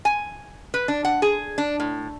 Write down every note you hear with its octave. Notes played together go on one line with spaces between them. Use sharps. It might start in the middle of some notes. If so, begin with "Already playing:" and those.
G#5
B4
D4
F#5
G#4
D4
A2